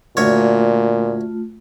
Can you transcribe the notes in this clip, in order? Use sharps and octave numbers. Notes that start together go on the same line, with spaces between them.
D2 A#2 A3 F4 C#5